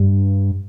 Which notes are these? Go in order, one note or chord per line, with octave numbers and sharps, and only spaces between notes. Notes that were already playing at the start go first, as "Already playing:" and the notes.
Already playing: G2